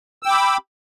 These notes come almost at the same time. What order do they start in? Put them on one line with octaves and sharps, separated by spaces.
E6 G5 D6 B5